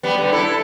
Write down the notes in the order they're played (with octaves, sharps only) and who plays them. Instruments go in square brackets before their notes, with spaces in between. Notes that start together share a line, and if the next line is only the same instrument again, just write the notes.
[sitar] G3 B3
D3 G3
E4 A4